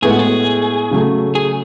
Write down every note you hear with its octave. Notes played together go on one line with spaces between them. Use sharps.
A2 G#3 B3 E4 G#4
F#4
G#4
C#3 F#3 A3
G#4